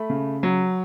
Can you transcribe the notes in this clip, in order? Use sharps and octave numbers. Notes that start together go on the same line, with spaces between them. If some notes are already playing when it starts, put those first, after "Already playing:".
Already playing: A3 B5
C#3
F#3